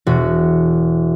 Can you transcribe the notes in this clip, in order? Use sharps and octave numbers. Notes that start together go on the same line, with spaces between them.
E1 F#4